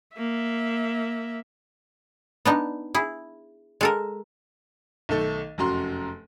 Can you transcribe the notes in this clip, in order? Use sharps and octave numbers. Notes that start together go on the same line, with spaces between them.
A#3 E5
B3 D4 D#4
E4 G#4
G#3 A4 A#4
B1 D#3 A3 A4
F1 F#2 F#4 A#5 C6